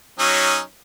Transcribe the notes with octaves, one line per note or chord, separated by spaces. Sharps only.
F#3 C#4 D#4